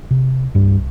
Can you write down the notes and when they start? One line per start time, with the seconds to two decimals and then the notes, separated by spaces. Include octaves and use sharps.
0.11 C3
0.55 C2 G2 G3